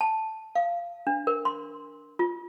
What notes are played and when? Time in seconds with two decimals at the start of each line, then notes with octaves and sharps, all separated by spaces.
0.01 A5
0.55 F5
1.07 D4
1.27 A#4
1.45 C6
2.19 F4